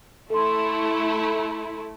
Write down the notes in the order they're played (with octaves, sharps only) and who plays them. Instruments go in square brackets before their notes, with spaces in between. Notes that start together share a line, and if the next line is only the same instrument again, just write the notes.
[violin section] A3 E4 [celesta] A4 C6